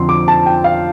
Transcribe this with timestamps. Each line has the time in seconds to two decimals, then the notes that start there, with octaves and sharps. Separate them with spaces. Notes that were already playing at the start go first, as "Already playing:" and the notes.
Already playing: F2 D3 F3 C4 C6
0.09 D6
0.28 A5
0.46 G5
0.64 F5